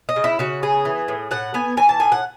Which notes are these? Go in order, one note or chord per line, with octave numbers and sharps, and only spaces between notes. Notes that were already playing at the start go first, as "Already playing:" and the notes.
D#5
C#3
E4
C#3 F#4
B3 G#4
E3
A2
A2 F#5
B3 G#5
E3 G#5
A5
A2 G#5
F#5